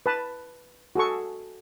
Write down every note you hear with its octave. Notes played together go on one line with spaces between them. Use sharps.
B4 A5
F#4 G#4 A4 C#6